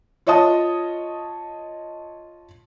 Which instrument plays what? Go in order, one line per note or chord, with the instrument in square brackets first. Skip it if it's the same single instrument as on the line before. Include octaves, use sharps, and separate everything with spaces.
[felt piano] F4 C#5 D#5 A5 D#6